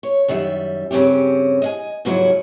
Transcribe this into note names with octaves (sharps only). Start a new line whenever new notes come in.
C#5
F#2 D#3 G3 E5
G2 C#3 C4 C#4 G4
D#5 F5 G#5
G#2 C#3 F3 F#3 E4 F#4